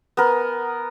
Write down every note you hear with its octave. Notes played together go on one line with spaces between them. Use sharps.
B3 A#4